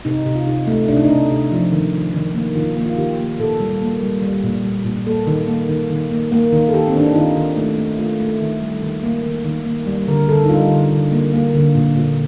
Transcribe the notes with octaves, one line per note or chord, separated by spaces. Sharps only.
C3 D#4
C3
F4
C3 D#4
A3
C3 D4
D#4
D4
C3
C3
F3
D#3
D#3
D#3
A#3
D#3 F4
A#3
F4
D#3 G4
A#3
A#2 A4
G3
A#3
G3
G3
A#2
G3
A#2
A#3 A4
D#3
A#3
D#3
D#3
A#3
A#3
D#3
A4
D#3 G4
C4
D#3 D4
D#4
D#3 F4
D#3
A3 D#4
A3
A3 F4
A3
D#3
G3
D#3
A#3
D#3
D#3
A#3
G3
D3 A#4
D3 A4
D#4
G3 F4
D3
D3
A#3
A#3
D3
A#2
A#2